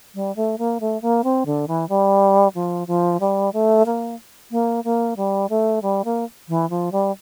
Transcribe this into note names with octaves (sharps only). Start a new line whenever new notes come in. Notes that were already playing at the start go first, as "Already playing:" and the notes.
G3
A3
A#3
A3
A#3
C4
D3
E3
G3
F3
F3
G3
A3
A#3
A#3
A#3
G3
A3
G3
A#3
E3
F3
G3